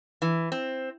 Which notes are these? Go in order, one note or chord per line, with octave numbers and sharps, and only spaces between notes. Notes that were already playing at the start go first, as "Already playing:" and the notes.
E3
C4